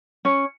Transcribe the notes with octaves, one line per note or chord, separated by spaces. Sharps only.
C#4